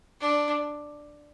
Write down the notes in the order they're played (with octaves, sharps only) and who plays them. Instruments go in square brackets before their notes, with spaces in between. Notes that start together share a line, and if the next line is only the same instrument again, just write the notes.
[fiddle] D4